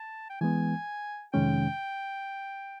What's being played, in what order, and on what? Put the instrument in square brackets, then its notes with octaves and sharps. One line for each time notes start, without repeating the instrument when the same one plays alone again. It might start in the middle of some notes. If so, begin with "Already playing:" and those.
Already playing: [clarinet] A5
G5
[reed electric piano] E3 G#3 B3 [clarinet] G#5
[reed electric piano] F2 C3 D#3 G#3 C#4 [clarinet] G5